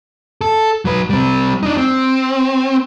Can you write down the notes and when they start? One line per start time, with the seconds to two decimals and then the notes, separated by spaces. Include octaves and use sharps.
0.41 A4
0.85 F#3 B4
1.10 G3 C4
1.63 D4 D#4
1.77 C4